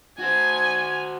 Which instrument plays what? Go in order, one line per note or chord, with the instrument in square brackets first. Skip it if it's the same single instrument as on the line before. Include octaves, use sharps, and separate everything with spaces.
[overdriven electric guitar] F#4 C5 [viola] G#5